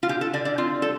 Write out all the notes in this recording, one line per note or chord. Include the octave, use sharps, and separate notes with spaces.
F4
D3 G4
A4
D3 D5
D5
C4 F4
G3 A4